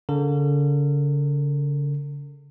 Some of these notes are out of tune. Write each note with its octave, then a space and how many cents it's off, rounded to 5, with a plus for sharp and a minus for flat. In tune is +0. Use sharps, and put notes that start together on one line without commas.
D3 -45 A#4 -45